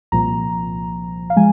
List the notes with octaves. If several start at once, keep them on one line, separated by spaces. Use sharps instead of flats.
C2 A#2 F3 A#5
F5
F3 G#3 G#5